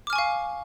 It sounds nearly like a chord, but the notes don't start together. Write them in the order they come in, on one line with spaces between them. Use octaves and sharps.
D6 F6 G#5 C#6 F5